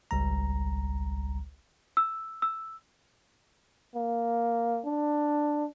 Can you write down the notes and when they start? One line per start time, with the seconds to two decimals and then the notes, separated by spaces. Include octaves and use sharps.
0.11 G#1 C#2 G3 A#5
1.97 E6
2.42 E6
3.96 A#3
4.86 D4